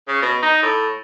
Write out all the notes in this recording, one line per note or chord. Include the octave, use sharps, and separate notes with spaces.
C#3
B2
D#4
A2